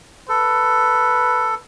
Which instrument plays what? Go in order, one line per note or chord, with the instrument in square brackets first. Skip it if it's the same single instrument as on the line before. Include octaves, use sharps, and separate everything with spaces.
[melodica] A4 [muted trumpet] B4